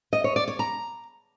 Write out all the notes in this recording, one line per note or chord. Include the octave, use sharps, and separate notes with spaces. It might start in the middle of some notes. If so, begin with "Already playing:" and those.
D#5
C#5
D5
C#5
A#5